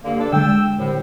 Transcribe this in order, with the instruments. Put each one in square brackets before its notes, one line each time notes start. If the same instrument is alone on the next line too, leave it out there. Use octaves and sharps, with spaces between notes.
[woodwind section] G2 D3 A#3
D4 A4
[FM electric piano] D3 G#3 [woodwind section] G5 E6
[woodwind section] C2 A2